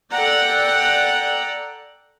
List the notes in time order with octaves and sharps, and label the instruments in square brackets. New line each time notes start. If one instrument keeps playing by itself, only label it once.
[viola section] A4 D5 F#5 G5 A#5